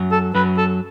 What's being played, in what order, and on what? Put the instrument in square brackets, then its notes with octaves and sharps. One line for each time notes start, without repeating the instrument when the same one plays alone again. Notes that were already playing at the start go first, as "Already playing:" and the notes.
Already playing: [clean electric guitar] F#2 F#3
[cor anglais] A4
[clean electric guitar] F#2 F#3 [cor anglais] B4
[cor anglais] A4